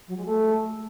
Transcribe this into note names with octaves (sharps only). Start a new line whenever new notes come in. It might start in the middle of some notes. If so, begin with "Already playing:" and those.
F#3
G#3
A3